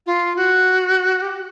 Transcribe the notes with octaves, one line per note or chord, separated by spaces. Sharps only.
F4
F#4
G4